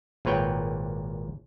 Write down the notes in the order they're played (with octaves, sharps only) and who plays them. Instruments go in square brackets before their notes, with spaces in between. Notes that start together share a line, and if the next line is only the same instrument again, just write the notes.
[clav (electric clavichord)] G#1 A#2 B4 C#5 G5